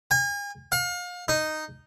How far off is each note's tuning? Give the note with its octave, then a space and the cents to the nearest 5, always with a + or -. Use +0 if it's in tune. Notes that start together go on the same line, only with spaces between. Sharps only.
G#5 -40
F5 +35
D#4 -5